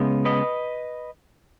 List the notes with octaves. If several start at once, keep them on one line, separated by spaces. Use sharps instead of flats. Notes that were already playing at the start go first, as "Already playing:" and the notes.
Already playing: C#3 G#3 B3
B4 D#5